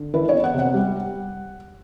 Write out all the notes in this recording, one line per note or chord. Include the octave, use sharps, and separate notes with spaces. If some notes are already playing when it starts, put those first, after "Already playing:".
Already playing: D3
E3 B4
C#5
B3
F#5
C3 F#5
G3